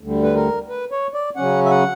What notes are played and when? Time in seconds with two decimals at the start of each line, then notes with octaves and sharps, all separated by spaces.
0.01 D2 D3 G3
0.23 B4
0.35 A#4
0.69 B4
0.92 C#5
1.14 D5
1.36 C#3 F#3 C#4 F#5
1.65 E5
1.70 F#5